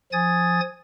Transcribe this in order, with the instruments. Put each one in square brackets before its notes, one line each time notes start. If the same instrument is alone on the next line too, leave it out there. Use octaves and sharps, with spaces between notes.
[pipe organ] F3 G#5 D#6 G#6 A6